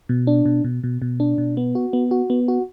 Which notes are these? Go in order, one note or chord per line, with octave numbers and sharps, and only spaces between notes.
B2
D4
B2
B2
B2
B2
D4
B2
B3
F#4
B3
F#4
B3
F#4